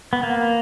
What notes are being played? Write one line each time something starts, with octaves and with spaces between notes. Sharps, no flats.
B3
A#3